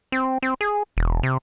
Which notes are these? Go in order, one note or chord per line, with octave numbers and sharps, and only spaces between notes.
C4
C4
G#4
E1
C3